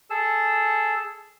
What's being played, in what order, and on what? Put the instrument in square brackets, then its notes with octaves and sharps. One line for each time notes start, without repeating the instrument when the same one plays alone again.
[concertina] G#4 A4 E6